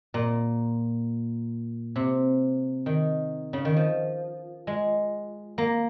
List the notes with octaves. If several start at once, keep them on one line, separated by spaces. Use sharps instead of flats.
A#2
C3
D#3
C#3
D#3
F3
G#3
A#3